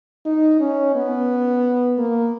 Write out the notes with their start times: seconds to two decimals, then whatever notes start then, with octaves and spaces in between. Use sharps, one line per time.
0.25 D#4
0.60 C#4
0.95 B3
1.98 A#3